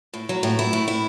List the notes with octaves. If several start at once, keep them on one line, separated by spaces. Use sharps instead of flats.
A2
F#3
A2
E4
A2
E4